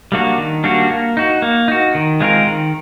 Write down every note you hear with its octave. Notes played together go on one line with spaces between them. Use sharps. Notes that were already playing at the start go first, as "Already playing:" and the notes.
G3 A#3 D4 F#4
D#3
G3 A#3 D4 F#4
A#3
D#4 F#4
A#3
D#4 F#4
D#3
G#3 C4 F4 A#4
D#3